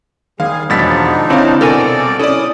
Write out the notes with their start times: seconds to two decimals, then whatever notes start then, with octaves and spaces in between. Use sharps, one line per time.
0.40 D#2 G3 G#4 F5
0.70 E1 F3 D4 D#4 B5 A6 B6
1.30 D3 C4 E4 C#5 F5
1.61 C2 B2 A4 A#4 D5 G#5
2.19 C#4 E4 A4 D5 D#6